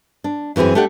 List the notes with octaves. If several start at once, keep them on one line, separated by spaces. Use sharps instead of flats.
D4
F#2 E3 C4 F#4 G#4
A3 D4 G4 D5 F#5